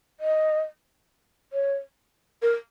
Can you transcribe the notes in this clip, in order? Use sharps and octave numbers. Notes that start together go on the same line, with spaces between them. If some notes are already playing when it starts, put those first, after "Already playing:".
D#5
C#5
A#4